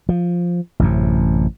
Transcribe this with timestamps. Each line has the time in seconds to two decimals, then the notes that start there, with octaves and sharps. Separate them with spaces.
0.09 F3
0.80 A1 F#2 C3